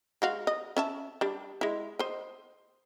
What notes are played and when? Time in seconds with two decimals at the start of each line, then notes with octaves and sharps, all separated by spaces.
0.22 G#3 F#4 F5
0.47 D#5
0.77 C#4 E5 A5
1.21 G3 D4
1.61 G#3 E4
1.99 C5 D#5